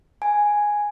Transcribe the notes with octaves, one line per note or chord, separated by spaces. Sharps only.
G#5